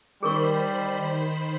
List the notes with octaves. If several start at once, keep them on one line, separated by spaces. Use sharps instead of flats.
D#3 G3 G#4 A#4 C5 B5 C#6